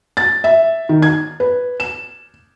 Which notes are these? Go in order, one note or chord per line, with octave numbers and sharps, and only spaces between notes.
A6
E5
D#3
G#6
B4
E7